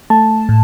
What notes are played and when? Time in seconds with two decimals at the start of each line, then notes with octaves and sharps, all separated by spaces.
0.10 A3 A5
0.49 A2